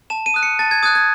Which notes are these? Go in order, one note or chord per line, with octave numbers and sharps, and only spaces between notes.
A5 E7
D#7
D#6 F#6
C#7
A5 A6
G#6
D#6 F#6 G#6
G#6